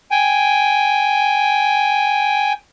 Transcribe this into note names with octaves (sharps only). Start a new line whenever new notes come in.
G5 G#5